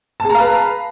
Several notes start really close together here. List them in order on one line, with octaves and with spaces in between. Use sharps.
A5 G#4 A#5 F5 B4